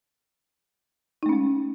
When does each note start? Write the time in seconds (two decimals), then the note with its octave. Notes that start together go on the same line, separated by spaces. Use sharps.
1.23 D#4
1.26 A3
1.29 C#4
1.33 G#3